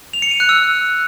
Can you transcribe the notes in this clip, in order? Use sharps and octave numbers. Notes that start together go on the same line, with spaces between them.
F7
C#7
D#7
F#6
E6